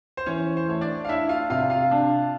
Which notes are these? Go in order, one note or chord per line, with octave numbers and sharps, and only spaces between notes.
C5
E3 C#4 C#5
C5
A3 C#5
D4 D5
F5
D4 E4 E5
F4 F5
C3 F4 F5
F4 F5
D4